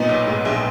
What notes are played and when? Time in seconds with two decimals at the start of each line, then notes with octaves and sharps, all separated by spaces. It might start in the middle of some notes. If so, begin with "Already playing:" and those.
Already playing: A#2 B3 D#4
0.09 B1
0.27 G#2
0.45 A#1